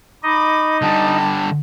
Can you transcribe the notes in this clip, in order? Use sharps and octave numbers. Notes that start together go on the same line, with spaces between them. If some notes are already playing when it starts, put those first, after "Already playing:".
D#4 D#5 B5 D6
D3 G3 A5